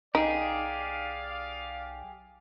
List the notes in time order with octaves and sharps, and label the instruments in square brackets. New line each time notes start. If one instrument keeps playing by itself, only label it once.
[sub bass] B1 [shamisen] D#4 [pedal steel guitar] G4 G#4 [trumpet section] D5 F5